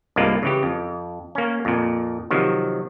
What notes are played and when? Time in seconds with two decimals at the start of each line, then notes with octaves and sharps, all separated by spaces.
0.16 C2 G2 G#3 A#3 F4 D5
0.43 C#3 E3 G4
0.63 F2
1.35 A#3 C#4
1.65 F2 A#2
2.31 C3 D#3 F3 F#3